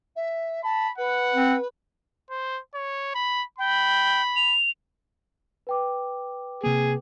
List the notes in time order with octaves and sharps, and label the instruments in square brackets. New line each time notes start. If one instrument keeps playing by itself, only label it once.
[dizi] E5
[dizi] A5 [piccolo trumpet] B5
[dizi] B4 [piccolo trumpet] F#5
[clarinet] C4
[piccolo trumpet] C5
C#5
B5
[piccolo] G5 [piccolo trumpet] B5
[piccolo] F7
[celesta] B4 G5 D6
[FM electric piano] C3 A#3 [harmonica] G#4